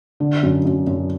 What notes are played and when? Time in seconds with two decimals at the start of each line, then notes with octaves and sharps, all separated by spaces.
0.20 D3
0.43 F#2
0.65 F#2
0.87 F#2